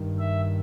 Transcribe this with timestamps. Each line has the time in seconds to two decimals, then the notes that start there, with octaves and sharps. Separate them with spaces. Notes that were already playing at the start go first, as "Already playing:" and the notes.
Already playing: G2 D#3
0.19 E5